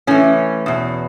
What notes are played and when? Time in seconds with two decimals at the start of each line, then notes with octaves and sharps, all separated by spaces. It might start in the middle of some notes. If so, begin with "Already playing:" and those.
0.07 A2 E3 C#4
0.66 E2 B2